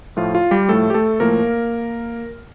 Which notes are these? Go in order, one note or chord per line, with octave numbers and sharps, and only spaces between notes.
A2 F3 A3 F4
F4
G3 G4
A2 F3 A3 A4
G4
A3 A4
A2 F3 A3 A#3 A#4